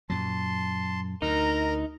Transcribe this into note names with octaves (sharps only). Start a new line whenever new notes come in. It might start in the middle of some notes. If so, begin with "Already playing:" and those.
F#2 A#2 F#3 A5 C6
D2 D#4 A#4 A#5